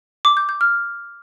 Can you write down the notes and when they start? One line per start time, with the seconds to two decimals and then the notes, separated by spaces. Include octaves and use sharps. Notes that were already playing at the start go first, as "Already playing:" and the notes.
0.25 D6
0.37 G6
0.49 G6
0.61 F6